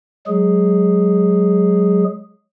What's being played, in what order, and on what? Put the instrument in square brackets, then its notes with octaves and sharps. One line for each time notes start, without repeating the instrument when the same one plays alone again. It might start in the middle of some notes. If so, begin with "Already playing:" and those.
[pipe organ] F#3 G#3 G#4